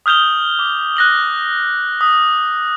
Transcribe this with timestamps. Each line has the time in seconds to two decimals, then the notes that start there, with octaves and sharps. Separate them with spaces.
0.06 D#6 F6 G6 F7 G7
0.59 D6
0.97 F#6 A#6 F#7
2.01 D#6